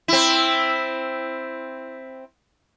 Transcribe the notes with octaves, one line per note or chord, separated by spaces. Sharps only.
C4 E4